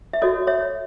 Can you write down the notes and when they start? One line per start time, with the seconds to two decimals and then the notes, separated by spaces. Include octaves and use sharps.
0.13 E5
0.22 F#4 A4 C#5 D#5
0.47 C#5 E5